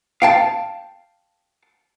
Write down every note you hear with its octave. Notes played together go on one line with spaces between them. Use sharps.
F5 G5 A5